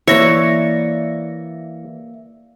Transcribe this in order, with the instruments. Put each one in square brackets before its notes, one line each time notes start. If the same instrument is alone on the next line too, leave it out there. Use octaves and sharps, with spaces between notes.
[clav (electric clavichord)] E3 [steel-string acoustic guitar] A#3 D5 E5 [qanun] C#5 [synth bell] A#6 C#7